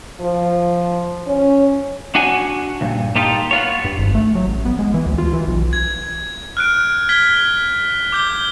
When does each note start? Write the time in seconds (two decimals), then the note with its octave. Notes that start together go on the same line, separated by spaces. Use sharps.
0.21 F3
1.27 C#4
2.15 D4 F#4 F#5 G#5
2.81 D2 G2 A#2
3.15 A#3 D#4 F4 G4 A4
3.51 B3 F4 C#5
3.84 G2
3.99 G#1
4.15 A3
4.35 F#3
4.47 A1
4.65 B3
4.79 G#3
4.94 E3
5.06 D2
5.18 F4
5.33 E3
5.48 B1
5.73 G#6
6.57 F6 F#6 D7
7.09 F6 G#6 B6 G7
8.12 D6 G6 G7